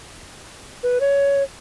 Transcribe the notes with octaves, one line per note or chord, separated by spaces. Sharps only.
B4
C#5